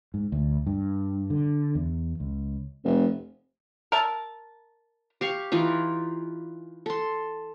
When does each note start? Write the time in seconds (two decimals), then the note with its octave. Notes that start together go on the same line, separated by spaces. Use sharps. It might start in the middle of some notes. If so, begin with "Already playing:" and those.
0.14 G#2
0.32 D2
0.66 G2
1.30 D3
1.75 E2
2.20 C#2
2.85 F1
3.92 A#4 E5 A5
5.21 G4 F5 C#6
5.52 E3 D#4 F4
6.86 A4 C6